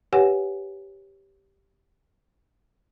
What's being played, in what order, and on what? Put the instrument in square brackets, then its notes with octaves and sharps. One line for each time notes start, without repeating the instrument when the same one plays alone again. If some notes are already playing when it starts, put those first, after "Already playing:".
[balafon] G4 B4 C#5 F#5 G#5